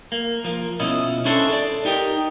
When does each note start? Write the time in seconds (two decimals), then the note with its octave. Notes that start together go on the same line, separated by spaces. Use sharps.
0.12 A#3
0.44 F3 A#3
0.80 B2 C#4 E4 F4 D#5
1.25 C#4 D4 E4 A4 C5
1.50 A4 D5
1.85 D#4 G4 A#4 D#5